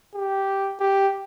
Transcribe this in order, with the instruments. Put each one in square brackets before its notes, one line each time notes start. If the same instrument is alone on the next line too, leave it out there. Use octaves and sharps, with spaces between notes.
[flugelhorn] G4
G4